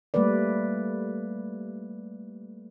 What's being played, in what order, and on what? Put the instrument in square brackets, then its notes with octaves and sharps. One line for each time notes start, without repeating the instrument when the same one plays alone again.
[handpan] G3 A3 A#3 B4 D5